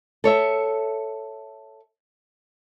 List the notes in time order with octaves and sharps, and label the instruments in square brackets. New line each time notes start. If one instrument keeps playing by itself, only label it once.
[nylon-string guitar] A4 C#5 E5